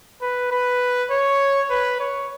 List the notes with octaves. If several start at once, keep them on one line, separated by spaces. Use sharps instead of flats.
B4
B4
C#5
B4
C#5